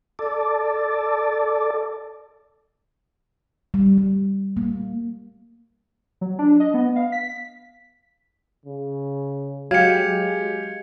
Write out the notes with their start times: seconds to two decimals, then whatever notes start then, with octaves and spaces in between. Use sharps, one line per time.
0.19 A4 D5
3.74 G3
3.98 G3
4.57 A#3
6.21 F#3
6.39 D4
6.60 D#5
6.74 B3
6.96 F5
7.12 B6
8.65 C#3
9.71 F#3 G#3 G4 F5 G#6 C#7